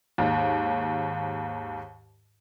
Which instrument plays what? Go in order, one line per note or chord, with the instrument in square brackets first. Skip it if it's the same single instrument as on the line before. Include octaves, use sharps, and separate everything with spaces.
[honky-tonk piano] D#2 G#2